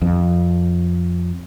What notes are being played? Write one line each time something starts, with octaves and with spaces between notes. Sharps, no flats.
F2